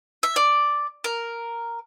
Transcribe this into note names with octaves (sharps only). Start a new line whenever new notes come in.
E5
D5
A#4